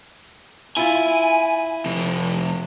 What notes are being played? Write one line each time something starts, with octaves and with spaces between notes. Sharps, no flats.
E4 F4 G#5
F2 C3